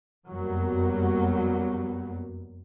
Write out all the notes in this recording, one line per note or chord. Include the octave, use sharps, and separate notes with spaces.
F1 F#2 F#3 G3 A#3 B3